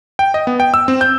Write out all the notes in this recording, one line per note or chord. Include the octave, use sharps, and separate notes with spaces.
G5
D#5
B3
G5
E6
C4
G6